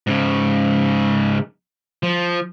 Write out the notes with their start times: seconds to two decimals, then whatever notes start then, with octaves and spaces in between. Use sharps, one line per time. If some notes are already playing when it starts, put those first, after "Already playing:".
0.07 G#2 C#3
2.03 F3